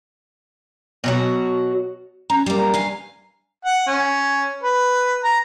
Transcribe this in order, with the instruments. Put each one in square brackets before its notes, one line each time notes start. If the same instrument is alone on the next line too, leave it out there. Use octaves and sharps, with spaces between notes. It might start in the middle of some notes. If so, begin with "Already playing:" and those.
[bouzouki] B2 F#3 F#4
[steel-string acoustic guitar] C#4 [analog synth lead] A#5
[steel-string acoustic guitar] G3 A#3 [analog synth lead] D5
[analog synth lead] A#5
[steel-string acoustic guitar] G2 F5 G#5
[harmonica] F#5
C#4
B4
A#5